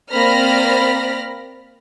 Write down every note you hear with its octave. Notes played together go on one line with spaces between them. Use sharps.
A#3 C4 D5 B5 F6 A#6